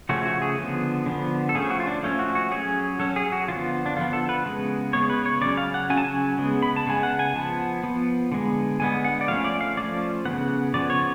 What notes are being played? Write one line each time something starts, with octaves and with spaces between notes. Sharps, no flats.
C#3 F3 A3 C#4 F#4
F#4
G#4
D3 F3 B3
D3 F3 B3
A4
F3 A3 C#4 G#4
F#4
F4
D4
F3 A3 C#4
F#4
F#4
F#3 C#4 G#4
F#3 C#4 A4
G#4
F#4
D3 F3 B3 F4
D4
D3 F3 B3 F4
A4
B4
C#3 G#3 B3
C#3 G#3 B3 C#5
B4
C#5
C#3 F#3 C#4 D5
F5
F#5
C#3 F#3 C#4 G#5
A5
G#5
C#3 G#3 B3
B5
A5
C#3 G#3 B3 G#5
F#5
G#5
F3 B3 A5
F3 B3
D3 G#3 B3
D3 G#3 B3 G#5
F#5
D5
F3 A3 C#4 F5
D5
F5
F3 A3 C#4 D5
C#3 F3 B3 F#5
C#3 F3 B3 D5
C#5